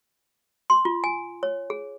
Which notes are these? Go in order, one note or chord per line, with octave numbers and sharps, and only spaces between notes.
C6
F4
G#5
C#5
G#4